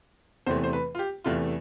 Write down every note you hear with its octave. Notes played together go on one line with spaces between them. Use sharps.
E2 C3 E3 A3 C5
C5
B4
F4
G4
E2 C3 E3 A3 F4